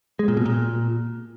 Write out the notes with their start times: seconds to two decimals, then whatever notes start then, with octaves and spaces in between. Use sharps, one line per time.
0.19 G#3
0.28 A#2
0.37 B2
0.46 A#2